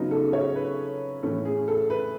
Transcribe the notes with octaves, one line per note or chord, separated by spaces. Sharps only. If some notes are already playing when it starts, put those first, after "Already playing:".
Already playing: C#3 F#3 B3 D#4
A4
C#5
B4
A2 E3 A3 C#4 E4 A4
G#4
A4
B4